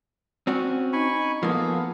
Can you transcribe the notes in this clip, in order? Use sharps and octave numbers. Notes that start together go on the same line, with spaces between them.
C4 C#4 F#4
D#4 G#5 B5 C#6
F3 A#3 B3 G#4 A4 F5